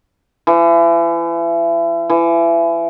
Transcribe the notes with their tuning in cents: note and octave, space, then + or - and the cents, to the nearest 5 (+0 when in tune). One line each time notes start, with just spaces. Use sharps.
E3 +35
E3 +30